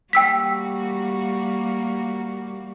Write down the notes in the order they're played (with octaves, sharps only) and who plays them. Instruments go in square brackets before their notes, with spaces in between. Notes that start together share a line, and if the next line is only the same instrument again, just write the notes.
[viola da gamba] G3 A#3 F#4 [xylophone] G5 E6 B6